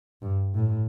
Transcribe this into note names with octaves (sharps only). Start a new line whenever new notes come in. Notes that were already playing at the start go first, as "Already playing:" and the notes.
G2
A2